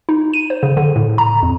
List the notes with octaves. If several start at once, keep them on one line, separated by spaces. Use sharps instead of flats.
D#4
D#7
C5
C#3
D3
A2
A#5
F2